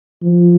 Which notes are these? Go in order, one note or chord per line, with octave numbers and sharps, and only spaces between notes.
F3